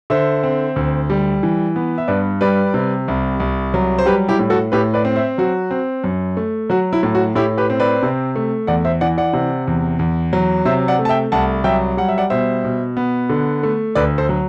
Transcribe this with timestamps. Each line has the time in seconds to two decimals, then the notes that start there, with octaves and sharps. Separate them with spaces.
0.10 D3 C5 E5
0.43 C4
0.76 D2
1.10 G3
1.43 E3
1.76 B3
1.98 E5
2.08 G2 B4 D5
2.41 G3 B4 D5
2.74 C3
3.08 C2
3.40 C2
3.74 F#3
3.99 C5
4.06 G3 G4 B4
4.28 E4 G4
4.39 A2
4.50 F#4 A4
4.72 A2 G4 B4
4.94 B4 D5
5.05 C4
5.16 C5 E5
5.38 F#3 F#4
5.71 C4
6.04 F#2
6.37 A3
6.70 F#3 F#4
6.93 E4
7.03 A2
7.15 F#4
7.35 A2 E4 G4
7.57 G4 B4
7.70 C4
7.80 B4 D5
8.03 C3
8.36 A3
8.67 E2 D5 F#5
8.85 C5 E5
9.01 E3 D5 F#5
9.18 D5 F#5
9.33 C3
9.68 E2
9.99 E2
10.33 F#3
10.65 C3 C5 E5
10.88 D5 F#5
10.99 A3
11.05 A5
11.09 E5 G5
11.32 C2 F#5 A5
11.64 F#3 E5 G5
11.97 G3 F#5
12.09 E5
12.18 D5 F#5
12.30 B2 C5 E5
12.64 B2
12.97 B3
13.30 D3
13.63 A3
13.95 D2 B4 D5
14.18 A4 C5
14.29 F#3